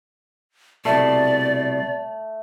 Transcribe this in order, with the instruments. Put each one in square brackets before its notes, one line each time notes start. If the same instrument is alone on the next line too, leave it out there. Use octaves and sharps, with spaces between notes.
[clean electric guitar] C2 B2 [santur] A3 [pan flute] D5